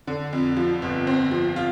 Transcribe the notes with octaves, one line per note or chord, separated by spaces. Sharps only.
D3
F2
F3
G1
C4
F3
F4